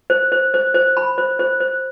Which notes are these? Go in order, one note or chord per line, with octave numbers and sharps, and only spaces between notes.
C5
C5
C5
C5
B5
C5
C5
C5